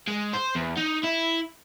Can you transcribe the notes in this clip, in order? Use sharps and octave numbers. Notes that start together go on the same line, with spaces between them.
G#3
C5
E2
D#4
E4